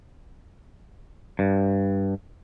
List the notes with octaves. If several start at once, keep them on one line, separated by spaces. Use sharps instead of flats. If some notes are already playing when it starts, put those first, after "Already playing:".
G2